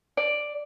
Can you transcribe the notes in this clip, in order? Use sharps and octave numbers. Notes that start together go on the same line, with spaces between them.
D5